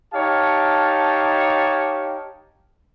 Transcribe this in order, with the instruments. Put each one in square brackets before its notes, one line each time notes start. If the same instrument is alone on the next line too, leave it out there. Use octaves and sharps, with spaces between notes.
[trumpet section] D#4 G4 C#5 F5 A5